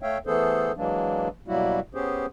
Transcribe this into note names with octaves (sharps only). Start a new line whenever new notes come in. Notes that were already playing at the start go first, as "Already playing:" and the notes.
A3 C#5 E5 F5 G5
E3 A3 B3 G#4 A4 C5
E3 F#3 G#3 A#3 D4
B2 F#3 G3 A#3 E4 F#4
B3 C#4 G4 G#4 C5